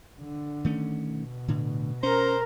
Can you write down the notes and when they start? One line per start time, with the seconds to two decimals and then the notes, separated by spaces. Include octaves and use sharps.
0.21 D3
0.64 D#3 A3 C#4
1.06 B2
1.48 A2 D3
2.03 C#4 A#4 C5 A#5